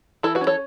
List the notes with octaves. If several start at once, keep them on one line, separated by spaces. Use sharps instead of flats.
E3 E4 A4
F#4 B4
C#4
A4 C#5